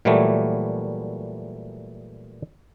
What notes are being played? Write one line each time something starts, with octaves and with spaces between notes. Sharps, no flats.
A#2 E3 F#3 G3 A3